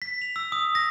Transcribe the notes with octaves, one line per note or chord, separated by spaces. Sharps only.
B6
F7
E6
D#6
A#6